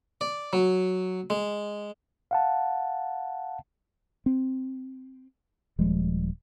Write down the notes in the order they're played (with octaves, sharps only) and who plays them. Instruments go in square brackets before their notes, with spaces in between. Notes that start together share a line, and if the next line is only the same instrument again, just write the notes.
[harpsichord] D5
F#3
G#3
[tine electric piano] F5 F#5 A5
[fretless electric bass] C4
D#1 F3 G3 G#3